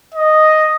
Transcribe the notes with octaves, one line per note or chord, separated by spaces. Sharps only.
D#5